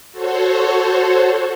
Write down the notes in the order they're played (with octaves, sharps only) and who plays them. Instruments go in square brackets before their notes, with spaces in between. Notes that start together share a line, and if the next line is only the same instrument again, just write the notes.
[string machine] F#4 A4 C5 C#5